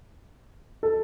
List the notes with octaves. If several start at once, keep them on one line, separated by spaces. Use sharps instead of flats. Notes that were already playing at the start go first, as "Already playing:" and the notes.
A4